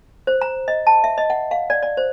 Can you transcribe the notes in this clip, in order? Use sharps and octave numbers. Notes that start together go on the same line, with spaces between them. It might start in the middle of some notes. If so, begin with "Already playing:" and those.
C5
A#5
D#5
A5
E5
D#5
F#5
F5
D5
D5
C5